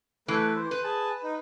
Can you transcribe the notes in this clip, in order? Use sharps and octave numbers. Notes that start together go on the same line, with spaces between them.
E3 A3 B4
C5
B4
G#4 A5
D#4